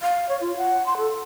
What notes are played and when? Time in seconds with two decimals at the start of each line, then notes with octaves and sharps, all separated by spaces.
0.01 F5
0.29 C#5
0.41 F4
0.57 F#5
0.86 C6
0.98 A4